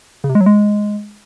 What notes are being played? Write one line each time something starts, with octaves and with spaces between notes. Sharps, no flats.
C#3
C3
G#3
F#3
G#3